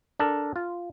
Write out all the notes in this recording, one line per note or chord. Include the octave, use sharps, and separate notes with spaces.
D4 A4 A#4
F4